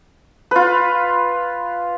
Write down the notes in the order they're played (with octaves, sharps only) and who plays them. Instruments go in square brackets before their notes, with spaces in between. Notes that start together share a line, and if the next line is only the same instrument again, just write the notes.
[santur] F4 B4